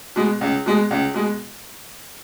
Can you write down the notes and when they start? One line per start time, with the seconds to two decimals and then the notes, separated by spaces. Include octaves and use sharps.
0.16 B2 G#3
0.41 C#2
0.66 B2 G#3
0.91 C#2
1.14 B2 G#3